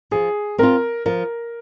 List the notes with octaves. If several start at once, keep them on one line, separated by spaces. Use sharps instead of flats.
F3 G#4
C4 F4 A#4
F3 A#4